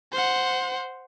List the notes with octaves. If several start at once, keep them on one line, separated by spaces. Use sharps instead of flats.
C5 F#5